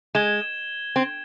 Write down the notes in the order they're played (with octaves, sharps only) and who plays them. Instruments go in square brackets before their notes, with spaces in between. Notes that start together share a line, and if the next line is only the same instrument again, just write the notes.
[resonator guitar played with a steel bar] G#3 [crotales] G#6 E7 G7
[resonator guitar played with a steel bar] C4